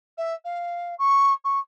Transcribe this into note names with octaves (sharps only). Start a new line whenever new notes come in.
E5
F5
C#6
C#6